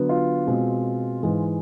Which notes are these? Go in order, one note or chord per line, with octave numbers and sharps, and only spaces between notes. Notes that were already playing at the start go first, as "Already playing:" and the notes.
Already playing: D3 F#3 B3
F4
B2 G#3 C4
G#2 E3 G#3